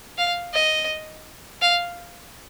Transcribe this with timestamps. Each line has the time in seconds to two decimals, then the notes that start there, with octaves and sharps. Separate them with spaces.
0.18 F5
0.54 D#5
1.62 F5